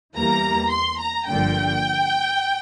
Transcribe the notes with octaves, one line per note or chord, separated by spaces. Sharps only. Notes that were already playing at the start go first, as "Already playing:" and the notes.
E2 E3 G3 A#3 A#5
C6
A#5
G1 G2 D3 F3 A#3 G5